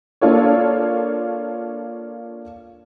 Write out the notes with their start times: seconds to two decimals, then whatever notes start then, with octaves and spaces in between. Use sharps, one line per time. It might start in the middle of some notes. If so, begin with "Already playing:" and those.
0.21 A#3 D4 F4 A4 C#5